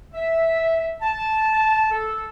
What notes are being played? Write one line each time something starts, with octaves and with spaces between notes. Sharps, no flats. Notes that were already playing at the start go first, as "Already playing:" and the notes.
E5
A5
A4